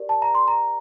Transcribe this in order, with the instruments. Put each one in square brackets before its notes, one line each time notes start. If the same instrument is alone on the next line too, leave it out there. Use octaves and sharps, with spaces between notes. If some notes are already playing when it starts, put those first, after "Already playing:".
Already playing: [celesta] G4 A#4 D5
A5
A#5
C6
A#5